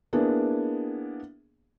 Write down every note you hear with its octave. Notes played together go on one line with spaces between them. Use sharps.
A#3 B3 D4 E4 G#4